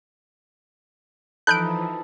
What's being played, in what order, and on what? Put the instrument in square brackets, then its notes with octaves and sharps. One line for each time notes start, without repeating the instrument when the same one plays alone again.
[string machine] E3 F3 [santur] D#4 A4 B5 [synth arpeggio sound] F#6 G6 D7